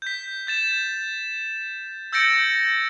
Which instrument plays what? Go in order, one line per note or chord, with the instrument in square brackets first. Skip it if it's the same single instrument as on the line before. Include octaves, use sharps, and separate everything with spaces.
[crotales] G6 B6
G6 A6 E7
E6 G6 A6 A#6 C#7 D7